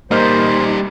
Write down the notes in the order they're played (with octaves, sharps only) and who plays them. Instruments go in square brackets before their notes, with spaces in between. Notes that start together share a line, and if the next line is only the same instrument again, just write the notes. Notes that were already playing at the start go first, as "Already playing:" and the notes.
[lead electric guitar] G3 D#4 [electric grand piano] A#3 D#5 F6 [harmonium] C5